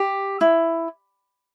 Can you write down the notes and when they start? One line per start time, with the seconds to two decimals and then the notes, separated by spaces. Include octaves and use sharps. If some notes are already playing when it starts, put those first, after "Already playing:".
Already playing: G4
0.41 E4